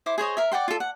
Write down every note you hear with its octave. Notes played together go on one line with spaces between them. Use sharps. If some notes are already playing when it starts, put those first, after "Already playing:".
E4 C5 D6
G#4 C5 C#5 D#5
A#4 E5
D5 F#5 G5 C6
F4 A4
F#5